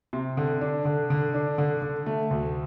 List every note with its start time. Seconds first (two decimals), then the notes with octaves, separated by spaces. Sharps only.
0.13 C3
0.37 D3
0.61 D4
0.85 D3
1.10 D3
1.34 D4
1.58 D3
1.82 D3
2.06 A3
2.31 D2